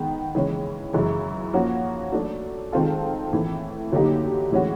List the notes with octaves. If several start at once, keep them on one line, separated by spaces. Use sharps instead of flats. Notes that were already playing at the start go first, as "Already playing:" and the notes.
Already playing: D#3 G#3 B3
C#3 E3 G#3 C#4
F#2 C#3 E3 G#3
F3 A#3 C#4 F#4
F#3 A3 D4
D#3 G#3 C4 F4 A4
A2 E3 A3
D3 F#3 A#3 D#4 G4
A2 E3 G#3 C#4 F#4